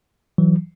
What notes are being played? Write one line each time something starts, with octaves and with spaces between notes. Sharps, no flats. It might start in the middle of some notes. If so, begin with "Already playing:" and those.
E3 F#3